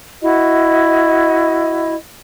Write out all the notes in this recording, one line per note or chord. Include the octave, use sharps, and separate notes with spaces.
E4 F#4 D#5